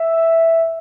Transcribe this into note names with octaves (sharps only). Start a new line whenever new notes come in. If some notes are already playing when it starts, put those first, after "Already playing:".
Already playing: E5